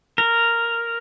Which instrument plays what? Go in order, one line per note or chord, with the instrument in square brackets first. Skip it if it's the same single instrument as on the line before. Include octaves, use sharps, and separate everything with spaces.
[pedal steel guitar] A#4